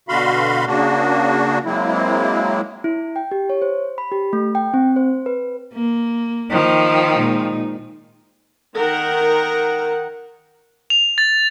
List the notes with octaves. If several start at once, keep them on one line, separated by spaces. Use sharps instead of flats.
B2 D3 F#4 F5 B5 C6
C#3 A#3 D4 F#4
F#3 G#3 A#3 C4 E4
E4
G5
G4
C#5
C5
B5
G4
A3
G5
C4
C5
B4
A#3
D#3 F3
A#2 G#3 D#4
D#3 A#4 F#5
F7
A6